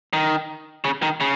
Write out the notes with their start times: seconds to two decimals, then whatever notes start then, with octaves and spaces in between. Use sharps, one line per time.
0.13 D#3
0.85 C#3
1.02 D#3
1.21 C#3